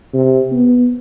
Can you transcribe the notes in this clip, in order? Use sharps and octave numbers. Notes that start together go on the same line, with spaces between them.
C3
B3